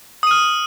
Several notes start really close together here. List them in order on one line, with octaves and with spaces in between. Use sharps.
D#6 D#7 F6